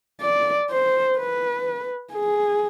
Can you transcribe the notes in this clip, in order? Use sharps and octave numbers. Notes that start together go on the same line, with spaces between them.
D5
C5
B4
G#4